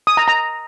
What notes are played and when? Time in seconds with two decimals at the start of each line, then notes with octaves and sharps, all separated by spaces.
0.07 D#6
0.17 A#5
0.28 A#5